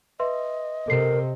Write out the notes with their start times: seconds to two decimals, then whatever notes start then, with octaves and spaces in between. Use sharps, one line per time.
0.20 B4 D#5 E5 C6
0.88 C3 A4 A#4 C7